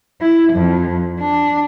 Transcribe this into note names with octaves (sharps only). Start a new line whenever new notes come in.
E4
F2
D4